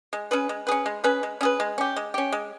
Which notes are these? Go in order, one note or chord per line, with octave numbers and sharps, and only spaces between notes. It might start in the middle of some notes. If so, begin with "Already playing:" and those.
G#3
C#4 G#4 B4
G#3
C#4 G#4 B4
G#3
C#4 G#4 B4
G#3
C#4 G#4 B4
G#3
C#4 G4
G#3
C#4 G4
G#3